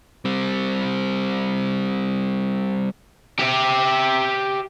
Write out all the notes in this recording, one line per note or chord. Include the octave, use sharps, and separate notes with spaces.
G3 C4
G4 E5